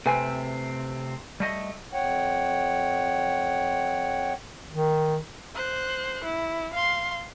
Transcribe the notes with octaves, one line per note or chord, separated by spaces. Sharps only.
C3 A3 C4 B4 G#5
G3 A3 D#5
F2 C#5 F#5 G5
D#3
C5 F#6
E4
F5 C6